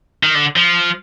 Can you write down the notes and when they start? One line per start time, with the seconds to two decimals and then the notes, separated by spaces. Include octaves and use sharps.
0.23 D#3
0.35 D3
0.56 F3